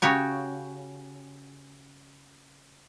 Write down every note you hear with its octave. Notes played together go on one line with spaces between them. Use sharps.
C#3 F#4 G4 C#5